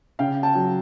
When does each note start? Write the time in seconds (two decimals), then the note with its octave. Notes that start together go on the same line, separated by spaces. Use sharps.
0.19 C#3 F5 G5
0.43 G5 A5
0.55 F#3